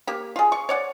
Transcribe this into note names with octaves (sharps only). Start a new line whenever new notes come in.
A#3 G4
F4 G#4
C#6
C#5 D5 F#5